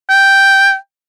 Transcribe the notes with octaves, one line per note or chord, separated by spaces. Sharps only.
G5